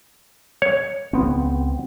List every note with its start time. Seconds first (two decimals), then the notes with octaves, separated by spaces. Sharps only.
0.62 C#5
1.13 C#2 B3 C4